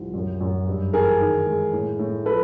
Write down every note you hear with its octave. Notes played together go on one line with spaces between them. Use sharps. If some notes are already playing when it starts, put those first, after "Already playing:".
Already playing: C2 F3
F#2
F#2
G2
E3 G#4 A#4
D#3
G#3
A2
A2
F3 A4 B4